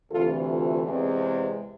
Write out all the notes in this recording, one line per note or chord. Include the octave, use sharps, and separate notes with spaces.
D2 C3 E3 F4 A4
F4 A4
E2 C3 G#3 C4